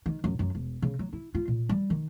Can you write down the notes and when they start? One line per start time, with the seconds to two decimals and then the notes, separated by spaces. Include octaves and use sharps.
0.06 D#3
0.24 F#2
0.39 F#2
0.55 E1
0.82 C#3
0.99 F#3
1.13 E4
1.35 F4
1.48 A#2
1.69 G3
1.90 D#3